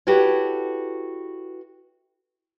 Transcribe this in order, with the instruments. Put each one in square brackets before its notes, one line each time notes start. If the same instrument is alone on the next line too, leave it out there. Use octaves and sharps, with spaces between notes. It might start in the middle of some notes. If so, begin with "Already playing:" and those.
[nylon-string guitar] E4 F#4 G4 A4 B4 C#5